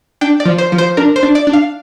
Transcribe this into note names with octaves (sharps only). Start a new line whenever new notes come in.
D4 G5
D5
F3
C5
F3
C5
D4 A#4
C5
D4
D5
D4
F5